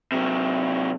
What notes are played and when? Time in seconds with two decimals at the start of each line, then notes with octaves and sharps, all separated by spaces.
0.12 C3 F#3